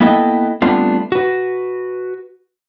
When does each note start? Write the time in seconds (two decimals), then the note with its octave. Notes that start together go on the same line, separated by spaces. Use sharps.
0.01 A#3 B3 E4 A4 D#5 G5
0.62 G3 A3 B3 C4 D4 F4
1.12 F#4 B4